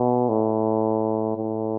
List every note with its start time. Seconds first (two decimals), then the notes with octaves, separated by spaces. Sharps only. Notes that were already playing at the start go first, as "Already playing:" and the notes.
Already playing: B2
0.29 A2
1.36 A2